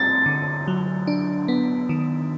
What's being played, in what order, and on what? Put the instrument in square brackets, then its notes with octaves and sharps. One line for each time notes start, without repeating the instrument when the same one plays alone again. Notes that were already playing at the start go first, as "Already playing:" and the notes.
Already playing: [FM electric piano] G3 C4 [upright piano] A6
[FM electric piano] D3
F#3
D4
B3
D#3